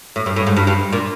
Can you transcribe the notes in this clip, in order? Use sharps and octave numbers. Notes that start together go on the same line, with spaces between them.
A2
G2
A2
G#2
G2
G2
A#2